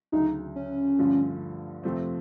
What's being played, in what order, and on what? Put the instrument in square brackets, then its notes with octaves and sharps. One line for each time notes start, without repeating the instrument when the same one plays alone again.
[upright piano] D2 C#3 F#3 [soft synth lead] D#4
[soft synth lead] C#4
[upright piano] G2 D3 F3 A3
F2 C3 F3 A3 C4